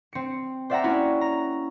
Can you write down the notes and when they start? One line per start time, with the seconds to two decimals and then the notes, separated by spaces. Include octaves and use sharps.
0.13 C4 C#7
0.70 C5 D5 E5 F#5 G5 A#5
0.84 A#3 C#4 E4 F#4
1.21 A#5